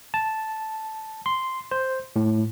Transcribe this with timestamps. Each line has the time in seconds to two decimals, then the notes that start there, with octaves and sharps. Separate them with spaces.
0.14 A5
1.26 C6
1.71 C5
2.16 A2